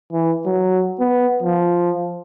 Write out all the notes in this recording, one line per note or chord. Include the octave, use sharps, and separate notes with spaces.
E3
F#3
B3
F3